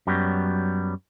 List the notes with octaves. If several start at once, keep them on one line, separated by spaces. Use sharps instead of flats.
F#2 F#3 G3 B3